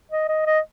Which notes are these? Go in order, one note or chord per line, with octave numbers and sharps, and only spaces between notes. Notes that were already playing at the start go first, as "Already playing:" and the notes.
D#5
D#5
D#5